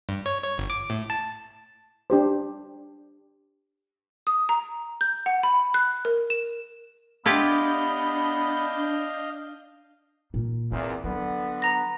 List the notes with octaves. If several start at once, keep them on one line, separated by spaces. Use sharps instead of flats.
G2
C#5
C#5
G1
D6
A2
A5
D4 G4 C5
D#6
A#5
G6
F#5
B5
F#6
A#4
E7
B3 D4 E4 F4 G4 D#5 F5 G6
A#2
E2 A#2 C4
D3 F#3 B3
A#5 A#6